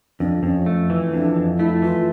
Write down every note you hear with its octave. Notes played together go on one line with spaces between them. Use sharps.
F2 D4
F2 C#4
A3
E3
F2 D4
F2
A3 E4
E3 F4